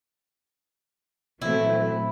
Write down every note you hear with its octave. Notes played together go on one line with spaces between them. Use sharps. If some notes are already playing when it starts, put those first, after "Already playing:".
A#2 E3 F#3 A3 C4 E4